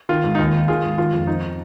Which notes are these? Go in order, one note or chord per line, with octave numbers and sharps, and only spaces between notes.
D#3 F4
G#2
D#4
D#2 F4
D#3
D#3 F4 G#4
G#2
D#3 F4
F2
F3 D#4